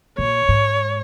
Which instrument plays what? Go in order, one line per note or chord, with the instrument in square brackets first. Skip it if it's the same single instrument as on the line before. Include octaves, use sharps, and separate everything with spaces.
[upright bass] A#2 [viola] C#5
[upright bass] G#2